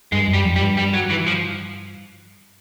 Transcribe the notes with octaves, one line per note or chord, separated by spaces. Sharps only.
G2 G#3
F#2
G3
F2
G3
G2
G3
F#3
E3
F3